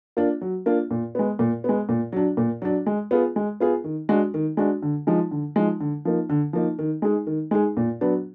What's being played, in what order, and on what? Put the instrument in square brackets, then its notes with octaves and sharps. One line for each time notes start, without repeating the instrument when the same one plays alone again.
[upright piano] A#3 D4 F4
F#3
A#3 D4 F4
A#2
G#3 B3
A#2
G#3 B3
A#2
F#3 D4
A#2
F#3 D4
G#3
B3 F4 G#4
G#3
B3 F4 G#4
D#3
G#3 D4 F#4
D#3
G#3 D4 F#4
D3
F3 G#3 D#4
D3
F3 G#3 D#4
D3
F3 A#3 D#4
D3
F3 A#3 D#4
D#3
G#3 D#4 G#4
D#3
G#3 D#4 G#4
A#2
F#3 B3 D4